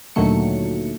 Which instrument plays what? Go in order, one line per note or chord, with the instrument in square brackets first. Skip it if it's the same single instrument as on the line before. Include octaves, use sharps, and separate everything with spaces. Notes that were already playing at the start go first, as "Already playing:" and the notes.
[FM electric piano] D2 A#2 D#3 F#3 A3 C#7